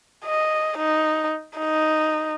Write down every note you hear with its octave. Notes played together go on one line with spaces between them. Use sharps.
D#5
D#4
D#4